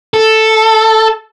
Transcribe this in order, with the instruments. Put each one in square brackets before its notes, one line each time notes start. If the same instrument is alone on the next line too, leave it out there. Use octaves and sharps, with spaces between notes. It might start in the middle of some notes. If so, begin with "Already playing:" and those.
[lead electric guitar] A4